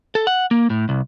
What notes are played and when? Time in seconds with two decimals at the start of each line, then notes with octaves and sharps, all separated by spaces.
0.15 A4
0.27 F#5
0.51 A#3
0.70 A2
0.89 C2